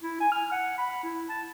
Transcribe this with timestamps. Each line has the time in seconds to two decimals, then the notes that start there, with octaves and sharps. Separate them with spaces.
0.03 E4
0.20 G#5
0.32 F6
0.52 F#5
0.78 B5
1.04 E4
1.29 A5